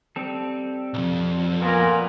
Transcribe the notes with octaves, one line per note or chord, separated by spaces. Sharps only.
G3 C4 A4
B1 F2
A#2 B3 A#4 G#5